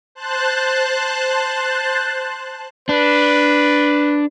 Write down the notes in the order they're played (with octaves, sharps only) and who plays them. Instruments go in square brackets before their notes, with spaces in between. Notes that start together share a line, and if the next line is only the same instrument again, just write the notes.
[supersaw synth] C5 A5 F#6
[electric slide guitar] D4 [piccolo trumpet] B4